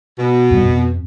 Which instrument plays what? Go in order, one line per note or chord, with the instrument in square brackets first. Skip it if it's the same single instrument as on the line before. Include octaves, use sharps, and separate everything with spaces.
[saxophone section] B2
[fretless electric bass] E2 A#2 G3
F2